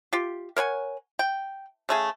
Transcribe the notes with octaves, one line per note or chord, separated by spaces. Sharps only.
F4 G4
A#4 C#5 F#5 G#5
G5
C#3 A3 G#4